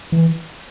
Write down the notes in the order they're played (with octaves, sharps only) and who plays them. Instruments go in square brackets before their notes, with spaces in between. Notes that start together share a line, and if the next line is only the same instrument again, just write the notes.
[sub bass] E3